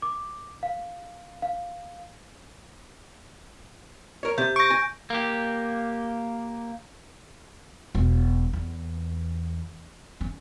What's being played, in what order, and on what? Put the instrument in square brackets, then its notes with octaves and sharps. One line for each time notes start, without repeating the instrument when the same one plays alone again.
[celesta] D6
F5
F5
[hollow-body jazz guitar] A#4 C#5
[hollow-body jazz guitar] C3 [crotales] G6
[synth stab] C#6 A#6 [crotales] G6 D7
[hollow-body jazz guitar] G#5
[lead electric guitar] A#3 G4
[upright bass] E1
E2
C#4